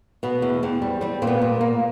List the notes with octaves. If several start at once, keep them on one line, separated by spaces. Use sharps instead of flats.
B2 B3
E2
E2 C4
G3
G3 C4
A#2 C4
B3
A#2
A#3